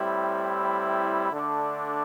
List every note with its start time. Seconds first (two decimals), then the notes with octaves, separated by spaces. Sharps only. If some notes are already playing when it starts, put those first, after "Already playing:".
Already playing: A2 G3 C4 E4
1.31 D3 A3 D4